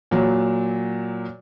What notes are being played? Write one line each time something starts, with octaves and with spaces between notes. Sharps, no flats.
A#2 F#3